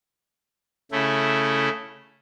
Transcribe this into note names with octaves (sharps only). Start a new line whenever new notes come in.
C#3 A3 E4